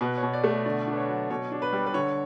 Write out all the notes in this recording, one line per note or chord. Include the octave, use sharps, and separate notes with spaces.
B2 B4
C#5
B2
D5
A3
D5
D3 D5
D4 B4
C#5
F#3
B2 C#5
D4
B4
G3
B4
D3 C#5